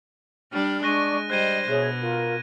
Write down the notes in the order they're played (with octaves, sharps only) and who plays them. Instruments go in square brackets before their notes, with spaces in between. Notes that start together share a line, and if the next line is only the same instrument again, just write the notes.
[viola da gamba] G3 D4 [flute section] F6
[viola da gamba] G#3 [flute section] D4 D5 C#6 [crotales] F#6 A#6 D#7
[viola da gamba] G3 C5 [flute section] D#5 [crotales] F#6 G#6 D#7
[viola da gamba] B2 [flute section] G#4 C#5 E5 [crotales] F#6
[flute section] F4 A#4